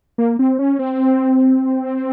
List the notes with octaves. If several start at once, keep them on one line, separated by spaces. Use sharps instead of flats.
A#3
C4
C#4
C4